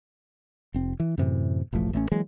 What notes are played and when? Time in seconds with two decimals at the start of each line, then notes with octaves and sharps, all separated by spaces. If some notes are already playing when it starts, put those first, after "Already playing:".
0.74 F1 C4
1.00 E3
1.18 F#2 A2 C3 E3
1.73 E1 A1 F3 A3
1.93 A1 A3 C4 C#4
2.12 E3 F#3 G#3 A#3